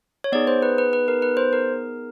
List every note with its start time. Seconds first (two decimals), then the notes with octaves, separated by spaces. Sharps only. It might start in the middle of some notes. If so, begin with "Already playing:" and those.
0.24 C#5
0.32 B3 D#4 G#4 D5
0.47 C5
0.63 B4
0.78 B4
0.93 B4
1.08 A#4
1.22 B4
1.37 C5
1.53 A#4